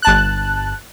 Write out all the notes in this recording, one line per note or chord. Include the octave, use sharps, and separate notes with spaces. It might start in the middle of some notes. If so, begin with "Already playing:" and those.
G1 A5 F#6